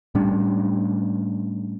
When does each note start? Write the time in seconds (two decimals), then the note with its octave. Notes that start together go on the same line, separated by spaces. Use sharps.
0.15 A2 G3 C#4 D4